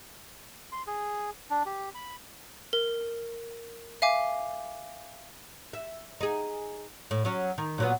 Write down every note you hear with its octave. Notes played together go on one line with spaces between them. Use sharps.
C6
G#4
D4
G4
B5
A#4
E5 F5 G#5 D6
E5
D#4 G#4
A2
F#3 C#4
D#3
A#2 F#3 B3